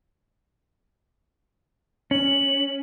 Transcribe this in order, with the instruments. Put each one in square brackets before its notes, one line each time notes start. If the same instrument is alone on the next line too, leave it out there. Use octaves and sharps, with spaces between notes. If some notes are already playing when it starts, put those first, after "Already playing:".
[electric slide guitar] C#4 [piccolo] F#7